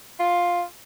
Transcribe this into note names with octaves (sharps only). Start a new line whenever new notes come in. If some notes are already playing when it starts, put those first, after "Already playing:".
F4